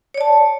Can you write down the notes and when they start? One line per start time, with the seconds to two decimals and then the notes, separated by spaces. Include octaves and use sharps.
0.14 C#5
0.18 D5
0.21 A5